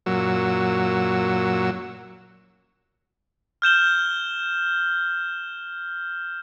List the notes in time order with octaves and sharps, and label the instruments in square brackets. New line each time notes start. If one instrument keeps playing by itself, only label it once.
[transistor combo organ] F#2 A#2 F#3 E6
[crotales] F6 G6 E7 G7